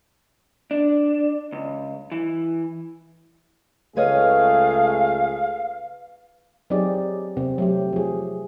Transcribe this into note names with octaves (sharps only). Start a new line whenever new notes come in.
D4
C#2
E3
C#2 A3 G#4 B4 C#5 D#5 F5
F#3 C4 D#4 G4 G#4 D5
C3 C4
F#3 A3 G4
F3 G#4